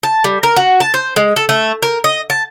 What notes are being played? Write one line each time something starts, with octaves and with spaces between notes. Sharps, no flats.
A5
G3
A#4
F#4
A5
C5
G#3
A4
A3
A#4
D#5
A5